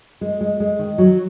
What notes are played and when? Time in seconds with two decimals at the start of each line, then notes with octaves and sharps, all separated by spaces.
0.21 G#3
0.41 G#3
0.60 G#3
0.79 D#3
0.98 F#3